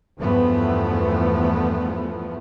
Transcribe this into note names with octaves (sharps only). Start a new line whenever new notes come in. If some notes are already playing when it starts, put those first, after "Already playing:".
E2 G2 E3 F3 A3 B3